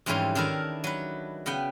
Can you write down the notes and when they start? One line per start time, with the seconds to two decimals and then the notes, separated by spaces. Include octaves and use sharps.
0.06 F2 G#2 E3 G3 C#4 C6
0.35 D#3 D4 E4 A4 A#4
0.84 F#3 B4
1.46 C#3 B3 F#5 G5